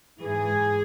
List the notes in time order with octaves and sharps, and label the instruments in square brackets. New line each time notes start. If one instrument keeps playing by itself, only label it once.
[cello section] G#2 E3 G#4